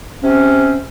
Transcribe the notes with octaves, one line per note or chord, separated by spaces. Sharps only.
C3 C4 C#4